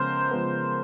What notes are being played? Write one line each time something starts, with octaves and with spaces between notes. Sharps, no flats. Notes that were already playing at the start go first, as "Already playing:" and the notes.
Already playing: C#3 F3 G#3 B3 A#4 C5
C#3 F3 G#3 B3